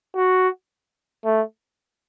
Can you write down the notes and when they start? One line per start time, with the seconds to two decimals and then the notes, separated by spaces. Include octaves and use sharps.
0.16 F#4
1.25 A3